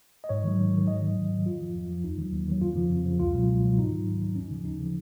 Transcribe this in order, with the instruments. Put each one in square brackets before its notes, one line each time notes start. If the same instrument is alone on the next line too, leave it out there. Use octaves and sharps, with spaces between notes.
[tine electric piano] D#5
G#2 C#5
D#3 F#3
G#2
D#3 F#3
G#2 D#5
D#3 F#3
G#2
D#3 F#3
F2 F4
F3
F2
F3
D#2 D#4
D#3 F#3
D#2
D#3 F#3
F2 F4
C#3 F3
F2
C#3 F3
C#2 F4
B2 F#3
C#2
B2 F#3
G#2 D#4
D#3 F#3
G#2
D#3 F#3
D#2 C#4
C#3 F3
D#2 D#4
C#3 F3